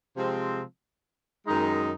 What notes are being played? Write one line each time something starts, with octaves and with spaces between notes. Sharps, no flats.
C3 F3 G#3 C4
F#2 D#3 G#3 D#4